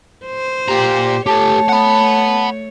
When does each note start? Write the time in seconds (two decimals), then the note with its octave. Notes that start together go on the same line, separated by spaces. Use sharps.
0.26 C5
0.68 A#2 G4 A#5
1.26 A3 G4 A4 C#5 A5
1.69 F#5 B5